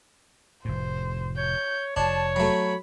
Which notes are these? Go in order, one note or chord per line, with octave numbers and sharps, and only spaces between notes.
F1 A2 C5
C#5 G6
F1 D4 C#5 A5
F#3 A3 B5